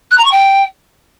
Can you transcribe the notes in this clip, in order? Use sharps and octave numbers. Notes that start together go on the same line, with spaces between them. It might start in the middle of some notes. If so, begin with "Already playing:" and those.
F#6
A#5
C#6
G5